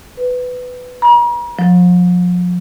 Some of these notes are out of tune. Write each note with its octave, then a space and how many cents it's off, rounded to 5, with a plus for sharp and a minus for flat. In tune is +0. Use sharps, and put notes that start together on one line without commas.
B4 +15
A#5 +40
F3 +35